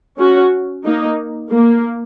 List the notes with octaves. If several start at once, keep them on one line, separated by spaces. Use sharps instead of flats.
C#4 F#4
A#3 D#4
A#3